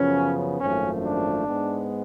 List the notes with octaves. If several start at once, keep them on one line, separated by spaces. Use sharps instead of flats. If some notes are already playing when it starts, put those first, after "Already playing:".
Already playing: F#2 C#3 F3 B3 C#4
G#1 F#2 F3 A3 C#4
D4
G#2 G#3 B3